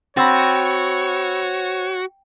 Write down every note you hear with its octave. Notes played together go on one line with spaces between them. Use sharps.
C4 F#4 C#5 B5 E6 A6